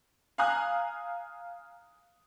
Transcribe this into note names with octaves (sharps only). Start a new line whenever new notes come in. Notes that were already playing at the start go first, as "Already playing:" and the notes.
F5 G#5 A#5 D#6 F#6